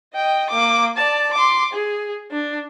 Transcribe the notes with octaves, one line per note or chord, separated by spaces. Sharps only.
D#5 G5
A#3 D6
D5 A5
C6 D6
G#4
D4